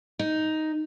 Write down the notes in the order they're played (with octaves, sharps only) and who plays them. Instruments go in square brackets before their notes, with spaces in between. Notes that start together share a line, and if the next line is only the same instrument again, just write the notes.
[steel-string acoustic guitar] D#4